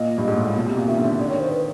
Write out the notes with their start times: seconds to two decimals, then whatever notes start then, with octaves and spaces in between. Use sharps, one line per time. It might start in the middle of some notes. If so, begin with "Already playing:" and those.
Already playing: A#2 D#5
0.18 G2
0.27 G#2
0.37 A2
0.46 A#2
0.56 B2
0.66 C3
0.77 A#2
0.87 D#3 E5
0.99 D3
1.03 E5
1.09 D3
1.19 D3 D5
1.30 D#3 C#5
1.40 C5
1.51 B4